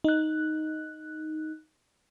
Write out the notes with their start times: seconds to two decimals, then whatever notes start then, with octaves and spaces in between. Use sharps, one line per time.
0.04 D#4 F#6